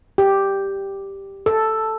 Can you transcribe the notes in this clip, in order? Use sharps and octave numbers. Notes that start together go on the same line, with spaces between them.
G4
A4